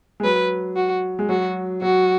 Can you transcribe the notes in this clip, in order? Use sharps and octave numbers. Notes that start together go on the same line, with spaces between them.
G#3
F#3 B4
F#4
G#3
F#3 F#4
F#3 F#4